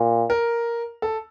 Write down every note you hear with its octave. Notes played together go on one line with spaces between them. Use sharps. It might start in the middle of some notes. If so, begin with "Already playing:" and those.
Already playing: A#2
A#4
A4